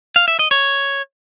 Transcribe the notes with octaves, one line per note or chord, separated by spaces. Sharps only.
F5
E5
D#5
C#5